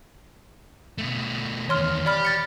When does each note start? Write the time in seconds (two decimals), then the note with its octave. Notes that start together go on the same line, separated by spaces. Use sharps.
0.98 B2 A3
1.69 E2 D#3 C#5 C6 F6
2.06 G4 D5 B5 F6
2.25 A6 C#7